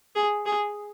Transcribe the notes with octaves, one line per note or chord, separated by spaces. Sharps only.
G#4
G#4